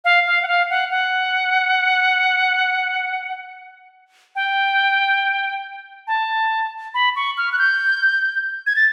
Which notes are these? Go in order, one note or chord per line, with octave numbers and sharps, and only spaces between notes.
F5
F5
F#5
F5
F#5
F#5
G5
A5
B5
C#6
F6
F#6
G6
G#6
A6